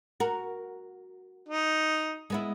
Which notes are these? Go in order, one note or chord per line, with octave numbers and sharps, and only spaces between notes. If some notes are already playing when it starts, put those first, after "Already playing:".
F#4 A#4
D#4
G#3 B3 E4